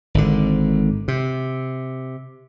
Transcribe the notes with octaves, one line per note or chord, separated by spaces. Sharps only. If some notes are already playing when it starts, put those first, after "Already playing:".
G#1 D3
C3